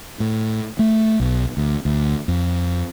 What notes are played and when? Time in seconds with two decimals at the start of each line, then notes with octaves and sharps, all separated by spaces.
0.20 A2
0.79 A3
1.20 B1
1.57 D2
1.85 D2
2.28 F2